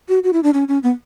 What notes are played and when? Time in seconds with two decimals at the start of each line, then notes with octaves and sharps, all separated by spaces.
0.09 F#4
0.24 F#4
0.33 E4
0.43 D4
0.54 C#4
0.68 C#4
0.83 B3